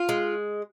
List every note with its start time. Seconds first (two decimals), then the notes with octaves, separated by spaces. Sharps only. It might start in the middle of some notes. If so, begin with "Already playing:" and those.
Already playing: F4
0.09 G#3